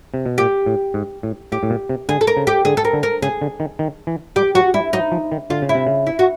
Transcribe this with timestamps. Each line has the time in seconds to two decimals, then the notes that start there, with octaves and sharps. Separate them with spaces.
0.14 C3
0.26 B2
0.38 A#2 G4
0.66 A2
0.94 G#2
1.23 A2
1.52 A2 G4
1.63 A2
1.70 A#2
1.89 C3
2.09 D3 G#4
2.21 A4
2.27 A#4
2.37 C#3
2.47 G4
2.65 D3 G#4
2.77 A4
2.85 A#4
2.93 D3
3.03 A#4
3.22 C#3 G#4
3.41 D3
3.60 D#3
3.79 D#3
4.07 E3
4.36 G3 G4
4.55 F#3 F#4
4.74 G3 E4
4.93 F#3 D#4
5.12 F3
5.32 D#3
5.50 D3 F4
5.62 C#3
5.69 E4
5.75 C3
5.87 C#3
6.07 E4
6.19 F#4